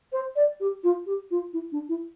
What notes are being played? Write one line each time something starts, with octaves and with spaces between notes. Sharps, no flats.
C5
D5
G4
F4
G4
F4
E4
D4
E4